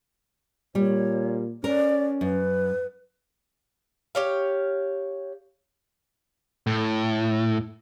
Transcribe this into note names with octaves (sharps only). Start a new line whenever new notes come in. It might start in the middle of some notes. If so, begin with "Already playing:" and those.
A#2 G3 C#5
C#4 A#4 D5
F#2 B4
G4 C#5 F5
A2